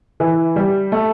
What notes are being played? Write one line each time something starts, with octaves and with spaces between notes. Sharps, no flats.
E3
G3
A3